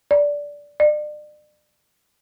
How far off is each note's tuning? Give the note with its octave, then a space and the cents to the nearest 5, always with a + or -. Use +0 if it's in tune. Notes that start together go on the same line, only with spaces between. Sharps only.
D5 -10
D5 +35